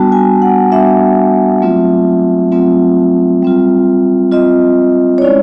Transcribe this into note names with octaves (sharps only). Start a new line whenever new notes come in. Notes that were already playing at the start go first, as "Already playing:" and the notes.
Already playing: G3 B3 D4 F#4 A5
G#5
F#5
G3 B3 D4 F#4 E5
F#3 A3 C4 F4
F#3 A3 C4 F4
G3 C4 F4
G3 C4 F4 D#5
C#5
G#3 C#4 E4 D5